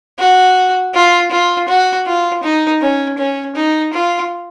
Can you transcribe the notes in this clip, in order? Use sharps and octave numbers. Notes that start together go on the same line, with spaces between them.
F#4
F4
F4
F#4
F4
D#4
C#4
C#4
D#4
F4